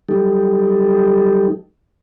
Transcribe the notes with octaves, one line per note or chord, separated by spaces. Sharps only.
F#3 G3 D#4 G4 A4